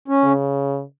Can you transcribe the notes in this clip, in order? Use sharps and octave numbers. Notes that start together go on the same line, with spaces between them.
C#4
C#3